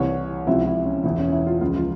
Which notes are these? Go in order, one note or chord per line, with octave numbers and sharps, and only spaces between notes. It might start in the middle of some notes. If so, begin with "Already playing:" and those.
Already playing: C2 C3 E3 C#5
C#2 C3 F3 E4
E4
C#4
E1 E2 E3 E4
C#4
E4
F4
C#2 C#3 F3 F4
F4